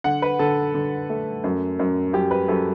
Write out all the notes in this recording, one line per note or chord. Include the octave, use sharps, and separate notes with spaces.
D3 F#5
B4
D3 A4
D3
A3
F#2
F#2
F#2 G4
B4
F#2 A4